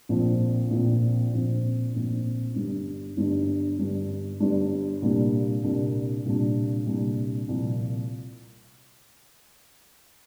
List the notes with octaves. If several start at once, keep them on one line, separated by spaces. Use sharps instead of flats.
A#1 A#2 F3 C4
A#1 A#2 F3 C4
A#1 A#2 F3 C4
A#1 A#2 F3 C4
G1 G2 G3 D4
G1 G2 G3 D4
G1 G2 G3 D4
G1 G2 G3 D4
C2 A#2 G3 A#3 D4
C2 A#2 G3 A#3 D4
C2 A#2 G3 A#3 D4
C2 A#2 G3 A#3 D4
C2 A#2 F3 A#3